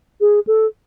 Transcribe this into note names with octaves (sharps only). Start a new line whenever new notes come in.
G#4
A4